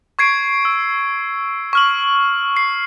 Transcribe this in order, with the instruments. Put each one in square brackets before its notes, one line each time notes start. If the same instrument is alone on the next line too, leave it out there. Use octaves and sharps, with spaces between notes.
[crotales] C#6 G#6 C7 D7
E6
C#6 F6 F#7
C7